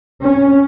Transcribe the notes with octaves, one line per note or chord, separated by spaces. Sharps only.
C#4